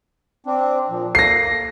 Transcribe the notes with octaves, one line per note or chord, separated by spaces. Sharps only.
C4 D4
A#2 F3
A#3 A4 A#6 C7